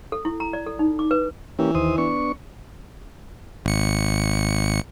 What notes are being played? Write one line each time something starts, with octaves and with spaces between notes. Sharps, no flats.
A4
E4
A#5
D5
A4
D#4
D6
B4
E3 A#3 C#4 G4
D#2 C5 D#6
B3 D4 C#6
G#1 C#7